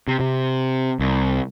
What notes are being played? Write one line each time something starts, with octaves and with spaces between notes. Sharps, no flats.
C3
C3
C2